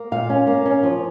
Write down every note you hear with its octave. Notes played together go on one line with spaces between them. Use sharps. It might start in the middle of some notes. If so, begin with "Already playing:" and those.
Already playing: A#3
A#2 F5
C#4
A#3
C#4
F3